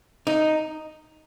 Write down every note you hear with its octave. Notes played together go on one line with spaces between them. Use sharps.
D#4